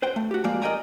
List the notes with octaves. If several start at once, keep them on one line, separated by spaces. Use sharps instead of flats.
B4 C5 F#5 G5
A3
F#4 G4
F3 G#3 A#3 G4 D5
A#4 D5 D#5 G5 G#5 A#5